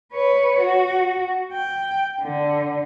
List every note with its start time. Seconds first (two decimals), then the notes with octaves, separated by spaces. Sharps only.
0.13 B4 C#5
0.61 F#4
1.53 G5
2.21 D3